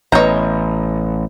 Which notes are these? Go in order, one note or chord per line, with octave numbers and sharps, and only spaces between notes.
A1 B3 C#5 D#5 A#5 G6